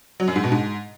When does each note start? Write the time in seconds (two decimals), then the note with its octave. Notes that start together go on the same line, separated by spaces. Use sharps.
0.20 F#3
0.28 F#2
0.36 G#2
0.44 B2
0.52 G#2